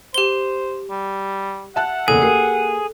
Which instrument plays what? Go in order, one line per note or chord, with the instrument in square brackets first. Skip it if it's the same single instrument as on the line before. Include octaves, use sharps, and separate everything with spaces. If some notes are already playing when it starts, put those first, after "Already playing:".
[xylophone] G4 G7 [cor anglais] C5
[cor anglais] G3
[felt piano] E5 A5 F#6 [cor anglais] F#5
[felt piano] F#1 E2 [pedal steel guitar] G#4 [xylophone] A4
[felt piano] A#3 G4 C7